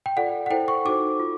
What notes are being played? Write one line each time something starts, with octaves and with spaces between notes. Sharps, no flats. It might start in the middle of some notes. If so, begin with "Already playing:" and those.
G5
F4 A4 D5 F#5
F#5
E4 A4 C5 G5
C#6
D#4 F#4 A4 C5 D6
F4 A4